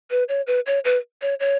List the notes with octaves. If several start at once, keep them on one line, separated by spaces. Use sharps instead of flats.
B4
C#5
B4
C#5
B4
C#5
C#5